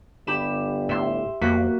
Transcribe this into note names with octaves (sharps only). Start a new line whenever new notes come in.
G1 G4 B5 E7
A2 E5 C6
F2 A#3 F#4 B6